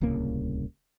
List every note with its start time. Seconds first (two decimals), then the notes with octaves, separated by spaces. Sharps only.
0.01 D1 C2 C#3 A#3